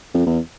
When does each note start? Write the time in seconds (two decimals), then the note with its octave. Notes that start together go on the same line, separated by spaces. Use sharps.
0.14 F2
0.26 E2